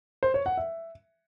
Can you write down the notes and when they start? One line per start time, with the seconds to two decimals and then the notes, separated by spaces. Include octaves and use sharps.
0.23 C5
0.34 C#5
0.46 F#5
0.57 E5